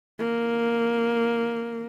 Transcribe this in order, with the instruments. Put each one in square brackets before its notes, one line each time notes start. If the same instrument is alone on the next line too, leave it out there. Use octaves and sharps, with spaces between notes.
[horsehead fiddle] A#3